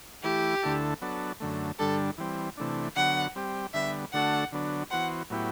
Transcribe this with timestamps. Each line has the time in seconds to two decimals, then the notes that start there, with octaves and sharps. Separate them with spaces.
0.23 E3 A3 E4 G4
0.63 D2 D3 A3 E4 A4
1.02 F#3 B3 D4 A4
1.40 F#2 D3 A3
1.79 G2 D3 G3 D4 A4
2.18 E3 G3 C4
2.57 C3 E3 A3 D4
2.96 D3 F#3 B3 F#5
3.35 G3 C4 G4
3.74 D3 G3 B3 E5
4.13 D3 A3 D4 F#4 A4 F#5
4.52 D3 F#3 B3 D4
4.91 E3 B3 F#4 C5 F#5
5.30 A2 F#3 B3 E4 G4